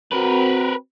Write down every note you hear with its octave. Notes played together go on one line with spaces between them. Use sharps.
C4 F#4 A#4 B4